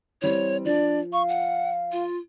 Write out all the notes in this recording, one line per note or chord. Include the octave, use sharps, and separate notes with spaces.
E3 G3 C4 C#5
F3 D4 D5
F5 C#6
F#5
F4